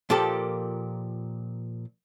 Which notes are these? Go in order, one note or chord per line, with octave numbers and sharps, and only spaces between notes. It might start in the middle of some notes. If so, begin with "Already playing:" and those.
A#2 F3 A#3 G4 A4